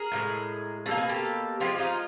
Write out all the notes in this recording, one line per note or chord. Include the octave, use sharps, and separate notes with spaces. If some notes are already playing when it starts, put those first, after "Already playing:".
Already playing: G#4 A#4
A2 F3 G#3
B2 G3 A4
A#3
G#4
G4 A4
D3 F3 G#3 F4 G4
D#4 F4